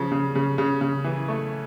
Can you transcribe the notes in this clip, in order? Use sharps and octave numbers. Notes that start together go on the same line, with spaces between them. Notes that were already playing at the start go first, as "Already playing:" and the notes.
Already playing: C#3 F3
C#3
C#3
C#3
C#3
E3
A3